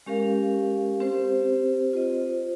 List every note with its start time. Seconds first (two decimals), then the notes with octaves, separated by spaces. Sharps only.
0.06 G#3 C#4 G4 A#4 F5
1.00 C4 G4 C5
1.93 F4 C5 D#5